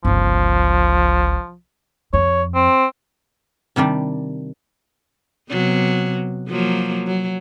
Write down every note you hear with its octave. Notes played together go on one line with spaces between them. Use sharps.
G1 C#2 F3
F2 C#5
C4
C3 D#3 G3 D4
C3 F#3 B3
F3 F#3 A#3
F#3